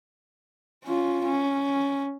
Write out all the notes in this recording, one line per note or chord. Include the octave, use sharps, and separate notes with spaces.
C#4 F4
C#4